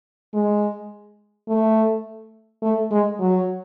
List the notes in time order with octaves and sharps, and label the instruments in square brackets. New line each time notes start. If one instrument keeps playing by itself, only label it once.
[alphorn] G#3
A3
A3
G#3
F#3